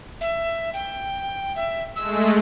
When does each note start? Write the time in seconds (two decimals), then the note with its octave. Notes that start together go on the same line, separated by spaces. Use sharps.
0.21 E5
0.74 G5
1.56 E5
1.96 G#3 A3 E6